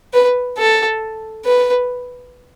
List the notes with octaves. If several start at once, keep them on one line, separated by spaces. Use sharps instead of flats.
B4
A4
B4